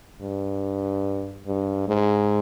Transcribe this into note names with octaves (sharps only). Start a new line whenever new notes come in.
G2
G2
G#2